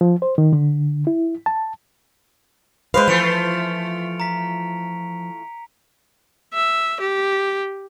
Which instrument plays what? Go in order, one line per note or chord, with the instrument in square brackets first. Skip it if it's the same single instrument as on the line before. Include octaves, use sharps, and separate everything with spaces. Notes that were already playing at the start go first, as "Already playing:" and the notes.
[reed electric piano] F3
C5
D#3
D3
E4
A5
[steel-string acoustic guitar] G#3 F5 [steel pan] B4 C5
[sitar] E3 A3 F4 [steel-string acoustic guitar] F3 [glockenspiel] C#7 D7 F7
[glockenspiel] A#5 B6
[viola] E5
G4